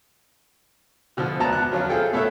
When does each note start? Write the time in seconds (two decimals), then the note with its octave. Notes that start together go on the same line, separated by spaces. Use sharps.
1.17 B2 D3 F3
1.40 D2 F#3 B3 D5 A5 A#5
1.53 B3 F#6
1.71 F3 F#3 C#4 F4
1.89 F4 G#4 A4 G5
2.13 A3 B3 A4 C#5 E5